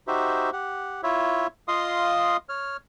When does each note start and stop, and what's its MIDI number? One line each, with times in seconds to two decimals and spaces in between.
0.08 0.50 63
0.08 0.50 66
0.08 0.50 67
0.08 0.50 72
0.08 0.50 76
0.53 1.01 67
0.53 1.01 78
1.03 1.47 64
1.03 1.47 65
1.03 1.47 73
1.03 1.47 76
1.68 2.37 65
1.68 2.37 75
1.68 2.37 77
1.68 2.37 84
1.68 2.37 87
2.49 2.77 73
2.49 2.77 89